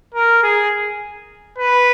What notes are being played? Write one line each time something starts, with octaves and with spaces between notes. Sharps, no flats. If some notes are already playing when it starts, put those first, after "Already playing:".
A#4
G#4
B4